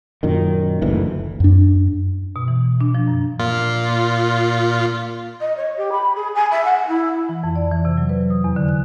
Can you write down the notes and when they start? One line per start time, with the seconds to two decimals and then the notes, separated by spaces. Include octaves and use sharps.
0.23 F#2 A#2 D#3
0.82 F#1 D2 E3
1.40 F#2 D4
2.36 B2
2.48 E3
2.81 D4
2.95 F3
3.08 F#2
3.39 A#2 F4
5.40 D#5
5.57 C#5
5.76 G4
5.92 B5
6.15 G#4
6.35 G#5
6.51 E5
6.64 F#5
6.87 E4
7.29 E3
7.44 F2
7.56 D5
7.72 E3
7.85 C3
7.97 F#3
8.09 B4
8.30 D#6
8.44 E2
8.56 D3
8.69 F#6